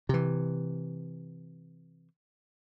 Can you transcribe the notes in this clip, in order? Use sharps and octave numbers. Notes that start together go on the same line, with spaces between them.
C3 E3